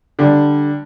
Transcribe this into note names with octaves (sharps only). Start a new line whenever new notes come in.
D3 G3